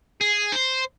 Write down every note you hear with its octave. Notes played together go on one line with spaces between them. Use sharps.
G#4
C5